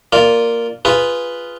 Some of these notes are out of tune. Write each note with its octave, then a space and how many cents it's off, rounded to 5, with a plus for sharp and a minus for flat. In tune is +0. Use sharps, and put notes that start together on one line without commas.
A#3 -5 F4 +0 D5 +0
F4 -5 G#4 +0 B4 +0